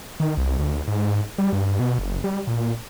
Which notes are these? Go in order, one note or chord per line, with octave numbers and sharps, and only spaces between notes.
D#3
C2
D2
G#2
G3
G2
B2
F#1
G3
A#2